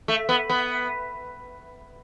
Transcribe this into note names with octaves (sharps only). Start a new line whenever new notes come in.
A3
B3
B3